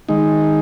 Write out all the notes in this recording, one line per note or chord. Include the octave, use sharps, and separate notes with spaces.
D#3 G#3 D#4